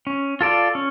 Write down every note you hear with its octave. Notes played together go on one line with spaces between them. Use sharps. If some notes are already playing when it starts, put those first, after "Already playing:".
C#4
F4 A4 D5
C#4